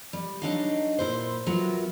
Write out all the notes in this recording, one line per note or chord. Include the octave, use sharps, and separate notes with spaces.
G3
F#3 G#3 D4 D#4 D#5 F5
A#2 E4 B4 C5
F#3 B3 F4 A#4 E5